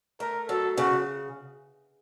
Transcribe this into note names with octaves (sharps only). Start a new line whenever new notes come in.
A3 A#4
F#3 A4
C#3 F#4